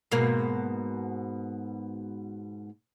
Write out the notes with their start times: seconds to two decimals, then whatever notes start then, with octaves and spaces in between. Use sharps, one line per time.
0.11 G#2 B2 A#3